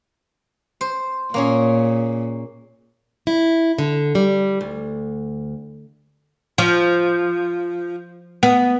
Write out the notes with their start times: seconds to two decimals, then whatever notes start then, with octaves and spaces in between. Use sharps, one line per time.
0.81 C5
1.34 A#2 A#3 C#4 G#4
3.27 E4
3.78 D3
4.15 G3
4.61 D2
6.58 F3
8.43 B3